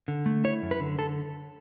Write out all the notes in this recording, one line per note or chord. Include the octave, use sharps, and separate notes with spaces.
D3
A3
E4 C#5
F#2
B4
D3
D3 A4